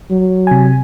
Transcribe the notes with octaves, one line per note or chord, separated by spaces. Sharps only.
F#3
C3 G#5